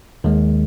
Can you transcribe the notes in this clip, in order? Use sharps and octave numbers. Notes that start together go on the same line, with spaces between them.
D#2 D#3 G#3